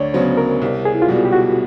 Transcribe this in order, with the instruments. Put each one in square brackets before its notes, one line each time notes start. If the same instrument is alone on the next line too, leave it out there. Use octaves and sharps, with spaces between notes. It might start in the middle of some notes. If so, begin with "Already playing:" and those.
Already playing: [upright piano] D2 [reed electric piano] C#5 D5
[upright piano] C#3 F#3 B3 [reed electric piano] C5
[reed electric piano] A#4
[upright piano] C2
[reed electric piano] G#4
E4
F4
[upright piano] B2 G3 [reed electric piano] F#4
[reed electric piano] G4
F#4